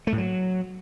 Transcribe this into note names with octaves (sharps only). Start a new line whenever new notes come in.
A3
A2
F#3